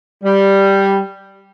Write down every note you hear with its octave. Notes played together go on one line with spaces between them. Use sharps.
G3